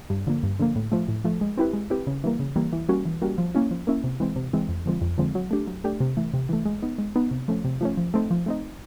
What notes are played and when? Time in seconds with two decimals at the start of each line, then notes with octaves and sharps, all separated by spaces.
0.10 G2
0.27 D3 F3 A#3
0.43 G2
0.59 D3 F3 A#3
0.76 A2
0.92 F3 A3
1.08 A2
1.24 F3 A3
1.41 G#3
1.57 C4 E4 G4 B4
1.73 G#3
1.90 C4 E4 G4 B4
2.07 C#3
2.24 E3 G3 A#3
2.40 C#3
2.56 E3 G3 A#3
2.73 E3
2.88 G3 A#3 C#4 F#4
3.05 E3
3.22 G3 A#3 C#4 F#4
3.38 F3
3.55 A#3 C#4 E4
3.71 F3
3.87 A#3 C#4 E4
4.04 C3
4.20 E3 G#3 C4
4.36 C3
4.53 E3 G#3 C4
4.69 F2
4.86 D3 F3 G#3 C4
5.02 F2
5.18 D3 F3 G#3 C4
5.35 F#3
5.51 A3 D4 G4
5.67 F#3
5.84 A3 D4 G4
6.00 C3
6.17 E3 A3
6.34 C3
6.49 E3 A3
6.65 G#3
6.82 B3 D#4
6.98 G#3
7.16 B3 D#4
7.31 C3
7.48 F3 A3 C#4
7.65 C3
7.81 F3 A3 C#4
7.97 F3
8.14 A3 C4 D#4
8.31 F3
8.46 A3 C4 D#4